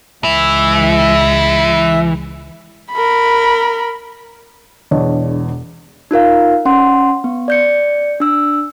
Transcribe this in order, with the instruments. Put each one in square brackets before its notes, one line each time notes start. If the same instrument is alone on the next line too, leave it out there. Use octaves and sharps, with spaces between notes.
[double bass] C#2 G#3 [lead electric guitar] E3 [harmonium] E5
[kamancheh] A#4 B5
[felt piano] E1 E2 D4 C#5 D#5
[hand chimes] D#4 F4 A#4 F5
C#4 F#5 C6
B3
D5 G6 C#7
D4 E6